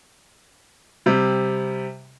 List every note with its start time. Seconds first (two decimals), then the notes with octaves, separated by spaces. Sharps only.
1.06 C3 G3